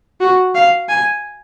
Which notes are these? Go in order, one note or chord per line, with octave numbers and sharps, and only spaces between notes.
F#4
F5
G#5